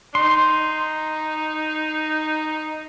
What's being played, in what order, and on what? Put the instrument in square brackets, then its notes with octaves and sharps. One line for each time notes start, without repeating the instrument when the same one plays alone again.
[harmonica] D#4 [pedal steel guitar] C6